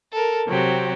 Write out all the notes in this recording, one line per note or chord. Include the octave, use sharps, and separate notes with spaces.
A4 A#4
C3 F#3 C4 G4